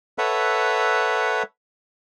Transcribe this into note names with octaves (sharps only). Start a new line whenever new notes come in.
A4 B4 C#5 E5 F#5